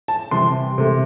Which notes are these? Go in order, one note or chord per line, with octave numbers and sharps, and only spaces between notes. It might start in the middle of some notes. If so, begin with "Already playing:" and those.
A5
C3 E3 G3 C6
C3 A3